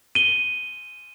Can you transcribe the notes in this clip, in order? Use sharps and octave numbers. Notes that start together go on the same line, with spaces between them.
D#7 G7